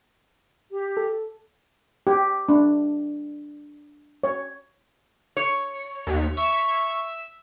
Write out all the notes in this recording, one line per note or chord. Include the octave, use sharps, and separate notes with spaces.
G4
A4
G4
D4
C#5
C#5
D#2 B6
E5 C#6